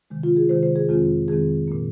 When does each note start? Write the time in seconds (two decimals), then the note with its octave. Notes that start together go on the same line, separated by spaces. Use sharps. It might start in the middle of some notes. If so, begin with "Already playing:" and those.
0.10 C3 D#3 G#3
0.23 F4
0.36 G#4
0.49 C3 D#3 G#3 C5
0.63 C5
0.76 G#4
0.89 F2 D#3 G#3 C4 F4
1.28 F2 D#3 G#3 C4 G#4
1.68 A#2 A#3